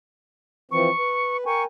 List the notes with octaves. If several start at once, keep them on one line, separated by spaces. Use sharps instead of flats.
E3 F3 C4 C#6
B4
A#4 G5 G#5 C#6